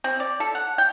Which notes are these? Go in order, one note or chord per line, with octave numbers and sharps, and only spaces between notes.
C4
D5
A4
F#5
G5